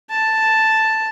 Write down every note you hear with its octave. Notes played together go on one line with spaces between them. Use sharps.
A5